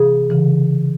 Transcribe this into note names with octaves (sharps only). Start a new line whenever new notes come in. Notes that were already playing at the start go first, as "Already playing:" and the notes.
Already playing: C3 E3 G#4
C#3 E3